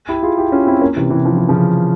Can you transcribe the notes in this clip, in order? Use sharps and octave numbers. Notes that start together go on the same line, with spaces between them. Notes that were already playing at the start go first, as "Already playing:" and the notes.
E4 G4
F4 G#4
E4 G4
C#4 F4
C4 E4
A#3 C#4
C3 E3
C3 E3
F3
E3
C#3 F3